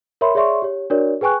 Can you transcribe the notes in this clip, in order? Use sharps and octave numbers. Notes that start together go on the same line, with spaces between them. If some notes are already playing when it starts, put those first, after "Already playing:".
A#4 C#5 E5 B5 C6
G#4 C#5 D5 E5 C6 C#6
G4 C#5
D4 F#4 A#4 C#5 D5
G#4 B4 G5 G#5 C#6 F#6